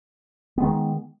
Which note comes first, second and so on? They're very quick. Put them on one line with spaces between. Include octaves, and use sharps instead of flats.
B3 G#3 D#3